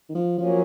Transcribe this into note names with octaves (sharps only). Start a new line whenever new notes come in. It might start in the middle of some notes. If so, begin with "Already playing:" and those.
D#3
F3
F3 F#3 A#3 C#4